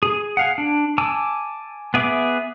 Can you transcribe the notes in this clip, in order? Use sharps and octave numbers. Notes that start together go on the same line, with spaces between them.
G#4
G#4 F5 F#5
D4
G#5 A5 D6 E6
B3 G#4 E5 D6